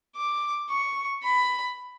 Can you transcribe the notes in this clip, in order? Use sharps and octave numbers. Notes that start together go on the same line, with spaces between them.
D6
C#6
B5